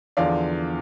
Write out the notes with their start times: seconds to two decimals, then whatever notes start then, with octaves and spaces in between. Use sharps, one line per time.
0.17 E2 D3 F3 D5 F5